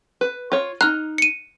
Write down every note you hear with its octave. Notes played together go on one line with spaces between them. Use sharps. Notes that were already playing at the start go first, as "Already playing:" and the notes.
B4
F4 C#5
D#4 A#5 F6 F#6
C#7 D#7